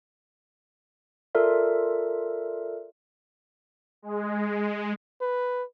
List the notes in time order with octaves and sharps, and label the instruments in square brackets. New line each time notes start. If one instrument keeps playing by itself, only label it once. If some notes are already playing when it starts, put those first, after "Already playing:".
[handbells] F4 A4 A#4 D5 E5
[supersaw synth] G#3
[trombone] B4